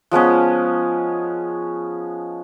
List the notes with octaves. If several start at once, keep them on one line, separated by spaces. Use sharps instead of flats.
F3 G#3 B3 C#4